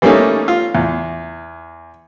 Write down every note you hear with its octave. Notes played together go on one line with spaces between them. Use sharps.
E3 G3 A3 A#3 C#4 D#4
F4
E2